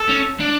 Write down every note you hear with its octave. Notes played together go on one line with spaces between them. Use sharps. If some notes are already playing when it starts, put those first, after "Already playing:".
Already playing: A4
C#4
D4